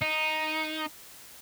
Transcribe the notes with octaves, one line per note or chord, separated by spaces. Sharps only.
D#4